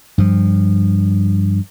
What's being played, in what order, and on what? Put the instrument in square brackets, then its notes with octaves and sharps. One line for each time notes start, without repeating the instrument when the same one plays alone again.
[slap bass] G2 F3